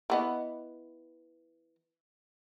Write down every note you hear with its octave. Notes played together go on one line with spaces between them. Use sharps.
E3 B3 D#5